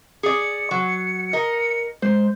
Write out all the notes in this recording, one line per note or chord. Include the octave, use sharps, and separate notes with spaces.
G#4 D5 C#7
F#3
A#4 D#5
G#3 C5